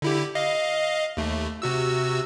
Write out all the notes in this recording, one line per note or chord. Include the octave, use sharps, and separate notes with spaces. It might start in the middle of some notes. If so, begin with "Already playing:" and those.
D3 E4 G4
D#5 F5
D#2 A3
C3 F#4 E6